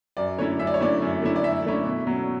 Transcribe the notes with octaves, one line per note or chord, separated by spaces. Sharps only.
F#2 D5
D3 A3 C#4 E4 C#5
F#2 E5
D5
C#5
D3 A3 C#4 E4 D5
F#2
D3 A3 C#4 E4
D5
F#2 E5
D3 A3 C#4 E4
B2
F#3 C#4